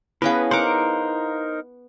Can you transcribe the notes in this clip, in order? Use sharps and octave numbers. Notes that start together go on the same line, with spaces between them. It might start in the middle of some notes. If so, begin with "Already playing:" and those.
B3 C#4 E4 G#4 B4 F5
D#4 A#4 C5 F#5 D6